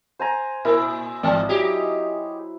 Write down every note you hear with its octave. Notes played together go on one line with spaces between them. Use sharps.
C5 G#5 A#5
A#2 E4 A#4
G#1 E3 D5 A5
F#3 D#4 G4 G#4